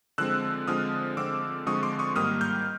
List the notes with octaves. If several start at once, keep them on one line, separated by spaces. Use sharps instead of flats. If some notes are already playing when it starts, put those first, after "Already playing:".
D3 F3 G#3 C4 E6 F#6
D3 F3 G#3 C4 D#6 F6
D3 F3 G#3 C4 D6 E6
D3 F3 G#3 C4 C#6 D#6
C6 D6
C#6 D#6
G#2 D#3 G3 A#3 D#6 F6
F6 G6